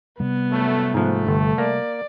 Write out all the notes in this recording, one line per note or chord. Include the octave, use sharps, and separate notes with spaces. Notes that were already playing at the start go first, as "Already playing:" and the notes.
C3 G3 B3
F#2 A2 A3
G#2 F3 A3
G1
A#3 D5